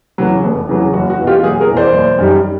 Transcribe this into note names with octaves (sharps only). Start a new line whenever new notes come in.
E2 C#3 F#3
F1
E2 C#3 F#3
F#1 F#4
F#4
E2 B2
F4 G4
F#1 F#4 G#4
G#4 A#4
E2 B2
C5 D5
F#1
F#2 D#3 G3